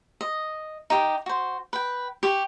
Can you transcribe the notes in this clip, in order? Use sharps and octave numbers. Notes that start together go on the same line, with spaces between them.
D#5
D#4 G4 G5
F#4 C5
B4 G5
G4 C#6